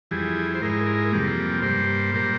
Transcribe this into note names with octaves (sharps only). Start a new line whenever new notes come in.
F2 E3 G3 G#4
C5
G#2 E3 G#3 A#4
A#4
F2 C3 G3 A#3
G2 G3 A#3 C5
A#2 G3 A#3